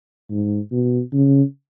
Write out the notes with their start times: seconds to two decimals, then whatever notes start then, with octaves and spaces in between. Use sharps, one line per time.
0.30 G#2
0.72 B2
1.13 C#3